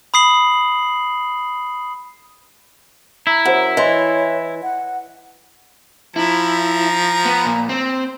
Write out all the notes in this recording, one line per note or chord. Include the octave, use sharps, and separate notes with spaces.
B5 D#6 C7 F#7
E4 A#5
F#2 C5 F#5
E3 C#5 D#5 C6
F#5
F3 E4 A#5
B3
A#2
C4